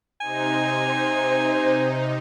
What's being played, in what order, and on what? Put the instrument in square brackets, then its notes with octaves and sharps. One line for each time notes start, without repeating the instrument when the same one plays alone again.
[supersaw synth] C3 D#4 [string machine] C5 [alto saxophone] G#5